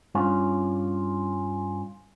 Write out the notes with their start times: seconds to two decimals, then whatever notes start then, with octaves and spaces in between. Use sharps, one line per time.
0.15 G2 C#4 F4